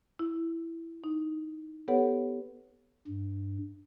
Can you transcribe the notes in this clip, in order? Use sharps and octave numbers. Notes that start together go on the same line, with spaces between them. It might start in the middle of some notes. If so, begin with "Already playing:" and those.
E4
D#4
B3 G4 A4 B4 C#5 F#5
G2